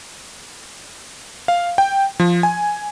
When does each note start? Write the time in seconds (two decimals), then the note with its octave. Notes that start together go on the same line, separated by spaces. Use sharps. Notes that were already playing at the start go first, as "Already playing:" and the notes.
1.48 F5
1.78 G5
2.20 F3
2.43 G#5